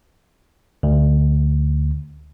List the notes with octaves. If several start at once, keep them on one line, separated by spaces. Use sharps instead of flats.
D2